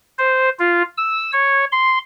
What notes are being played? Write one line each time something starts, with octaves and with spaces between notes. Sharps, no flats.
C5
F4
E6
C#5
C6